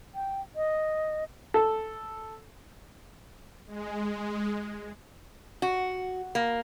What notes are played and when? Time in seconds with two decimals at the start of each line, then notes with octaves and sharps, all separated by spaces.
0.15 G5
0.56 D#5
1.54 A4
3.67 G#3
5.62 F#4
6.35 A#3